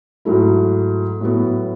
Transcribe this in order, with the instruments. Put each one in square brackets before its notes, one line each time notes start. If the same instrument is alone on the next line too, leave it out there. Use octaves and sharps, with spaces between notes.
[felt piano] G#2 F#3 A3 E4
A2 F#3 B3 F#4